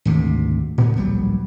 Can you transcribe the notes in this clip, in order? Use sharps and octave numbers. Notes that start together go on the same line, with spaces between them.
G#1 D2 C3
A2 B3
D1 A#1 F#3 G3